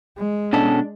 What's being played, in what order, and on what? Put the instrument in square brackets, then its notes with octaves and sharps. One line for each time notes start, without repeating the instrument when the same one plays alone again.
[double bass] G#3
[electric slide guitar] B2 C#4 A4 [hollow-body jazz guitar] D4